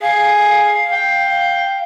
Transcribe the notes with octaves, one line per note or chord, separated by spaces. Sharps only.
G#4 F5
G5